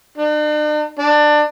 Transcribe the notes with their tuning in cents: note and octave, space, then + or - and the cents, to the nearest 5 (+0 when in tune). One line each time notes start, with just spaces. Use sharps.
D4 +45
D4 +20